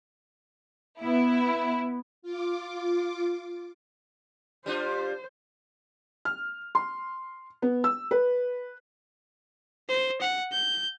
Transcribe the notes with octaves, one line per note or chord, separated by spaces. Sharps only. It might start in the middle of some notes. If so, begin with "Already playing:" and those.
B3 E4
F4 D6
G3 D4 F4 C5
F6
C6
B3
E6
B4
C5
F#5
G6